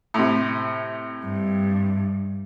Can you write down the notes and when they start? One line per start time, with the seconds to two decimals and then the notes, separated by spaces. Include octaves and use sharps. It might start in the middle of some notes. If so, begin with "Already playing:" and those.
0.14 A2 C3
1.25 G2